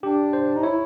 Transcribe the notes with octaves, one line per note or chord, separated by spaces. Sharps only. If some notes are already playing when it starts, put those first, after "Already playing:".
D4 G4
C5
D#4
E4 C#5